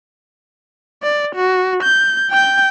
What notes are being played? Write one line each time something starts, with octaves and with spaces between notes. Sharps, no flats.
D5
F#4
G6
G5 G6